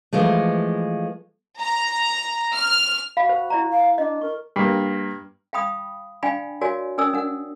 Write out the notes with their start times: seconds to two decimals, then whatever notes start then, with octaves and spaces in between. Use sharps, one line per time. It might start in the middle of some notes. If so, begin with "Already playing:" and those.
0.13 E3 F3 G#3 A3
1.60 A#5
2.55 F6
3.17 F#4 F5 B5
3.29 C5
3.50 E4 D5 A#5
3.69 F5
3.98 D4 D#5
4.21 A#4 C#6
4.56 G2 A#3
5.53 F5 G5 B5 D#6
6.23 D4 D5 F5 G5 G#5 B5
6.61 F#4 A#4 C#5 D5 F5 G#5
6.98 C#4 A#4 D5 G#5 D#6 E6
7.13 D4 A#4 F#5